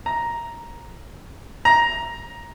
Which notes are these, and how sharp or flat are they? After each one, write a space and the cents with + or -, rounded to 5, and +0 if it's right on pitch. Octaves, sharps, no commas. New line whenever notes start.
A#5 +5
A#5 +10